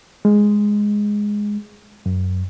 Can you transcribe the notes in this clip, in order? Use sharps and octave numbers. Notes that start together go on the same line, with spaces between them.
G#3
F#2